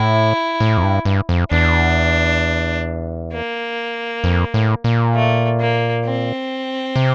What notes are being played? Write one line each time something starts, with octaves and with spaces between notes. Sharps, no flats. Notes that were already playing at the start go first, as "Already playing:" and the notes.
Already playing: A2 E4
A2
F2
G2
G2
F2
E2 D4
A#3
F2
A2
A#2
A3
A#3
C4
C3